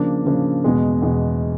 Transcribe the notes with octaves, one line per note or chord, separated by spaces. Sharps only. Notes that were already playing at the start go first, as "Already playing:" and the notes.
Already playing: C#3 F3 A#3 D4
C#3 F3 A#3 D4
E2 B2 G#3
E2 B2 G#3